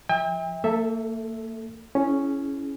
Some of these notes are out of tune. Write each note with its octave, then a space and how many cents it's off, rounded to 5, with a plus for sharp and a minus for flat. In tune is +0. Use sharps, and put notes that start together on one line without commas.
F3 +0 E5 -30 G5 +40
A#3 -40 A4 +0 E5 +0
C#4 +0 E4 +0 G#4 +25